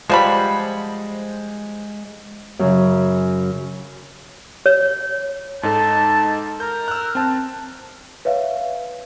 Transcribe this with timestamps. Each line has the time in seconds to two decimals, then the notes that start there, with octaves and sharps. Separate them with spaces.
0.10 F3 G3 G#3 C5 F#5 B5
2.59 F#2 C#3
4.66 C#5
5.63 G#2 D#4 A4 A5
6.60 A#4 G6
6.88 E6 F#6
7.15 C4 A5
8.25 B4 C#5 E5 F5